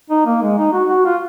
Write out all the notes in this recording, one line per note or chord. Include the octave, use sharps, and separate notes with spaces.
D#4
A#3
G#3
D#4
F#4
F#4
F4